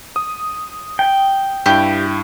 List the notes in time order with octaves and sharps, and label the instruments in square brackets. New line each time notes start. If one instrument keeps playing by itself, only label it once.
[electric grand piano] D#6
[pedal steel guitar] G5
[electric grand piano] G2 E4 [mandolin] G4